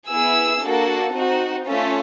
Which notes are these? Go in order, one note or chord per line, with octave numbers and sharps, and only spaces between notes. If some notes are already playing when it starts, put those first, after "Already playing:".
B3 E4 G#4 E6
A#3 D4 F#4 A4
C4 D#4 F#4
A3 C#4 F4 A4